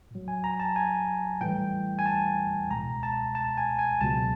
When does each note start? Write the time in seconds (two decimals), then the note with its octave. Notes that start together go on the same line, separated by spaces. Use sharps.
0.11 A2 F#3
0.28 G#5
0.44 A#5
0.60 A5
0.76 G#5
1.41 A2 E3 G3 G5
1.99 G#5
2.06 A5
2.71 C#2 B2 G#3 A#5
3.03 A5
3.35 A5
3.57 G#5
3.79 G#5
4.00 C#2 B2 F#3 A5